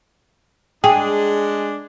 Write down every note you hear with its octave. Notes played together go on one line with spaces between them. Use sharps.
G#3 D4 G#4 G5